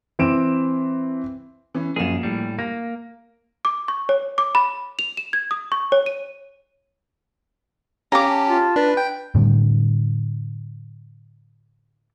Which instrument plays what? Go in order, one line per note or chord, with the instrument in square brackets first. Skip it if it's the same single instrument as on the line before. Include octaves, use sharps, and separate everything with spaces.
[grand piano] E3 C4 D7 E7
[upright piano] E3 C#4
[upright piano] A#1 A#3 E7 [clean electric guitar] F#2 G#4
[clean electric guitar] A2 G3
[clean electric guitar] A#3 [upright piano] A#6
[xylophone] D6
C#6
C#5
D6
B5
F7
E7
G#6
D#6
C#6
C#5
D#7
[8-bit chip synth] C#4 G4 [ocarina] F5 [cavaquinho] A#5 D6
[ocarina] A5
[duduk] F4
[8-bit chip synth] D4 [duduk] B4
[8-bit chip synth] G5
[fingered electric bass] A2 D3 G3